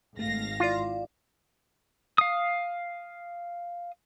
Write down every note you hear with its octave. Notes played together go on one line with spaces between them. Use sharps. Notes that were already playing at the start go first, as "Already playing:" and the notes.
G#1 A3 F5 A#6
E4 F4 D5
F5 D#6